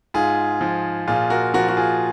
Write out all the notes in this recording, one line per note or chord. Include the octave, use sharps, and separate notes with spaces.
G#2 F4 G#4
F3
A#2 F4 G#4
F#4 A#4
F3 F#4 A#4
F#4
F4 G#4